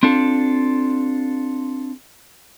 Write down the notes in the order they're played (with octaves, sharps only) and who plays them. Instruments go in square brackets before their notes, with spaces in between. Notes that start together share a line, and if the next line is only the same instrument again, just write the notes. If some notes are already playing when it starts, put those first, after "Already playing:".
[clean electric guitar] C4 D4 F4 A4